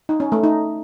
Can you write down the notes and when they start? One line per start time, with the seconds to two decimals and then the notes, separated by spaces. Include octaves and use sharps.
0.09 D#4
0.20 C#4
0.32 A3
0.44 D#4